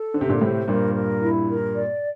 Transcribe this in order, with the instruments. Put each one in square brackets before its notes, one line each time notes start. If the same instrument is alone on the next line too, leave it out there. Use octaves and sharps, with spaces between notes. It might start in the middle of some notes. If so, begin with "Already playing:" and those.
Already playing: [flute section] A4
[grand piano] D3 [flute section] C5
[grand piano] C3
A#2 D3
[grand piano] A2 C3 [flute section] C5
[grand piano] G2 A#2 [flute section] A#4
[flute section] A#4
E4
A#4
D5